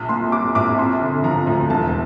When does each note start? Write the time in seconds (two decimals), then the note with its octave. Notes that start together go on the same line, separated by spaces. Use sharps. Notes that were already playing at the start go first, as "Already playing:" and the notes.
Already playing: A#1
0.09 A#2 C6
0.32 G3 D6
0.55 A#1 D6
0.78 C4 C6
1.01 D3
1.24 F3 A#5
1.47 D2
1.70 E1 A5